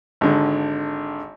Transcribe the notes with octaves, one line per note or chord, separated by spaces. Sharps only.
G#1 D3